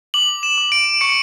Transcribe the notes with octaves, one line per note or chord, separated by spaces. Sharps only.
D6 F#7
E7
D6
D7
C#6 C#7